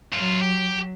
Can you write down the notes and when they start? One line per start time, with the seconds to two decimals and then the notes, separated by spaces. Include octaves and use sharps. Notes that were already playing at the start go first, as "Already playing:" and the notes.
0.13 F#2 F#3 F4
0.42 G4